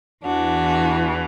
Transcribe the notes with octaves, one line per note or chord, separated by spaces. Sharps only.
E2 E3 D4 F#4